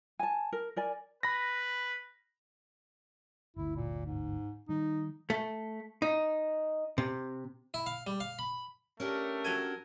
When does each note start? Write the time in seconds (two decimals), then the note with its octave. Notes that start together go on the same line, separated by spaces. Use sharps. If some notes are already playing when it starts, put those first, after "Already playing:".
0.19 G#5 A5
0.53 A#4
0.76 A#4 D5 G#5
1.23 B4 B5 A#6
3.56 G1 D2 E4
3.76 A#2
4.06 G#2
4.69 D#3 G3 D#4
5.30 A3
6.02 D#4
6.98 C3
7.74 E4
7.86 F5
8.07 G3
8.20 F5
8.39 B5
9.00 A3 C#4 D4 G4 A#4
9.44 F#3 A4 G#5